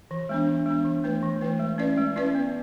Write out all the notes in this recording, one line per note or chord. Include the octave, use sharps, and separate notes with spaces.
E3
G#3 B3 D4
E3
G#3 B3 D4
E3
A3 E4 B4
E3
A3 E4 B4
G#3
C#4 E4 B4 D5
G#3
C#4 E4 B4 D5
B3